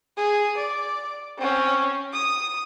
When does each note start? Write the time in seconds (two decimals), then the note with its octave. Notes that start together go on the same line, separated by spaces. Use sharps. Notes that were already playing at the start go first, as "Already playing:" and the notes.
0.17 G#4
0.57 D5
1.38 C4 C#4
2.13 D#6